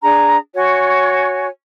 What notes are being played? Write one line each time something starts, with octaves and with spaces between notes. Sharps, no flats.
D4 G#4 A#5
F#4 C#5 G#5